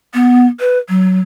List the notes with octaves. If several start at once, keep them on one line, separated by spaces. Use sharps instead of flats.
B3
B4
F#3